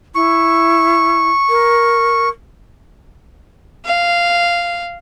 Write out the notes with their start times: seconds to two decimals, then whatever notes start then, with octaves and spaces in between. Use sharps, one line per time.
0.15 E4 C#6
1.49 A#4
3.85 F5